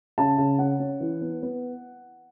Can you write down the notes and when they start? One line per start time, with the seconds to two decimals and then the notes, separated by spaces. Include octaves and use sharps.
0.18 C#3 A5
0.38 C#3
0.59 C#4 F#5
0.80 C#4
1.00 E3
1.21 B3
1.43 B3